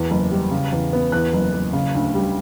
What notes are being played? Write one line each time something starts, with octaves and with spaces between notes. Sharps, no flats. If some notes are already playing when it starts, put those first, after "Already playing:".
Already playing: E2
F#1
G3
C#3
E2
B3
E2 F#6
F#1
F#1
C#3
D2
G3